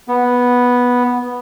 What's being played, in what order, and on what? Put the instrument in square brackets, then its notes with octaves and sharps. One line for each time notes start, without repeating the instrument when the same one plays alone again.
[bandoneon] B3